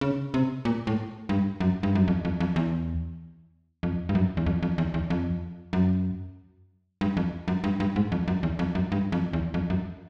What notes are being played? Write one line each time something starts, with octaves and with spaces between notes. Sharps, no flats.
C#3
C3
A#2
A2
G2
F#2
G2
F#2
F2
F2
F2
E2
F2
G2
F#2
E2
F2
F2
E2
E2
F2
F#2
G2
F2
F#2
G2
G2
G#2
F2
F#2
E2
F2
F#2
G2
F2
E2
F2
F#2